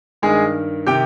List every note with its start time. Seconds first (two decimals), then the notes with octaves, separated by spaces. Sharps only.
0.22 G2 D#3 G#3 G#4
0.87 C3 D#3 G4 G5